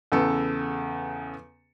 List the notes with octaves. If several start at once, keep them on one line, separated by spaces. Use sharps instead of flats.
E2 C#3 B3 A4